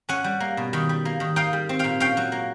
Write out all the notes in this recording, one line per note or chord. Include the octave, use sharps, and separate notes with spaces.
C#4 F#5 G#5
G3
A#3
B2
D#3
G3
A#3
D#3
D#4 F5 G5
G3
C4
A#2 F5 G5
C#4 F5 G5
F#3
A#3